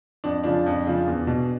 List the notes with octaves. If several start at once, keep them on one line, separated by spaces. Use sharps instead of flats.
F2 D4
C#3 F3 D4
F2
C#3 F3
E2
B2